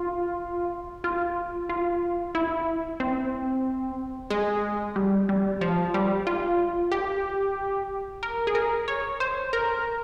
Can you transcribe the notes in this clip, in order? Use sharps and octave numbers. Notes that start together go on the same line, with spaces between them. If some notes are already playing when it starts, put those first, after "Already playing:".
Already playing: F4
F4
F4
E4
C4
G#3
G3
G3
F3
G3
F4
G4
A#4
G#4
A#4
C#5
C5
A#4